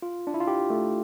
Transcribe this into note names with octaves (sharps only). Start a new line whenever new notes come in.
F4
D4
E4
F4
G4
A3